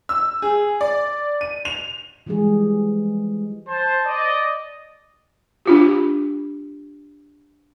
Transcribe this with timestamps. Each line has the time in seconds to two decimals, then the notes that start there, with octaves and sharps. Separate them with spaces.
0.09 E6
0.42 G#4
0.81 D5
1.41 D#7
1.65 F7
2.27 E3 F3 G3 G#3 G#4
3.68 C5 A5
4.05 D5 D#5
5.66 D4 F4 G4